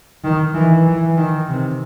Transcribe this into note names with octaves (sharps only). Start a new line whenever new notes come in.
D#3
E3
E3
D#3
C3